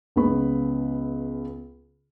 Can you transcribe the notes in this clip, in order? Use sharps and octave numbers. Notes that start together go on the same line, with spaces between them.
C#2 C#3 B3 B5